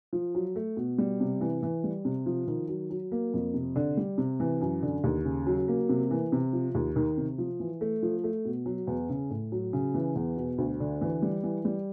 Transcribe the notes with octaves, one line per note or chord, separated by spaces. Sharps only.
F3
F#3
A3
B2
G3
C3
E3
E3
G3
C3
F3
D#3
F#3
F#3
A#3
F2
C3
D3
G3
C3
E3
F#2
D3
D#2
C#3
F#3
A#3
C3
E3
C3
F3
D#2
D#3
C3
F3
E3
A3
F3
A3
B2
F#3
E2
C#3
A2
F#3
C#3
E3
E2
B2
D2
D3
E3
G3
E3
G3